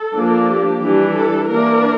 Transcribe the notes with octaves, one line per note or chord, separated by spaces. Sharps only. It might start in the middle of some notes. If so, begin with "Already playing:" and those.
Already playing: A4
F3 A#3 D4
G4
E3 G3 D4
A4
E3 A#3 D4 A#4